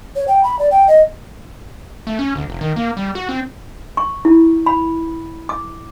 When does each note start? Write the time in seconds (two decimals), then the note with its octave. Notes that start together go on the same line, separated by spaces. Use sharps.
0.16 C#5
0.28 G5
0.43 B5
0.59 D5
0.71 G5
0.88 D#5
2.07 A3
2.19 C#4
2.35 D2
2.49 F1
2.61 D#3
2.76 A#3
2.97 G3
3.15 F#4
3.29 C4
3.97 C#6
4.25 E4
4.66 B5
5.49 D6